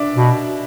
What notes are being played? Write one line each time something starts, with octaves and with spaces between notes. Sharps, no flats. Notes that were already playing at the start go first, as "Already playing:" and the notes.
Already playing: D4 D5 E5
B2